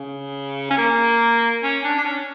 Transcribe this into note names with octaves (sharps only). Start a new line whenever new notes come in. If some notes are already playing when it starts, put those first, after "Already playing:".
Already playing: C#3
C#4
A#3
C#4
D4
D4
C#4